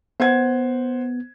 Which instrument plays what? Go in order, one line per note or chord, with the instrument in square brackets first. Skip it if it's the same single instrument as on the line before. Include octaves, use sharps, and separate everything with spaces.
[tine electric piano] B3 [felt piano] C5 F#5 G#6